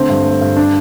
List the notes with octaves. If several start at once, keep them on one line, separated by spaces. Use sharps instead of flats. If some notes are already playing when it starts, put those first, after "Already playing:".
Already playing: D3 A3 C4
G2
A3
G2
D4